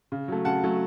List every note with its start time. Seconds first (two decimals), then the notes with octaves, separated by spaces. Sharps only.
0.12 C#3
0.28 F#3 A3
0.45 C#3 F#5 A5
0.63 F#3 A3